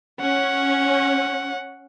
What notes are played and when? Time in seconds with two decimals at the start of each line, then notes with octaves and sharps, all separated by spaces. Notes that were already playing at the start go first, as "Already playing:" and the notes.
0.21 C#4 F#5